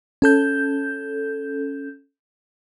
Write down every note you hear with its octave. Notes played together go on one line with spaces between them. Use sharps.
C#4 A4 G6